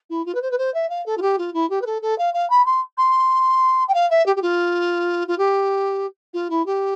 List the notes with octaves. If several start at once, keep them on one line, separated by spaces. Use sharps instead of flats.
E4
F4
B4
C5
B4
C5
E5
F5
A4
F4
G4
F4
E4
G4
B4
A4
A4
F5
F5
B5
C6
C6
G5
F5
E5
G4
G4
F4
F4
G4
F4
E4
G4